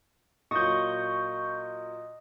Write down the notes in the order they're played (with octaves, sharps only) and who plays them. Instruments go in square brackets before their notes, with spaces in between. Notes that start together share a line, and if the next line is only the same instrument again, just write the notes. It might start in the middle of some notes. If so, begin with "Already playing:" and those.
[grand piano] A#2 F#3 [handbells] D#5 D#6 [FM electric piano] C#6 G6